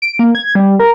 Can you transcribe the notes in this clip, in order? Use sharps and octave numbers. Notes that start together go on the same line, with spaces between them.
D7
A#3
G#6
G3
A#4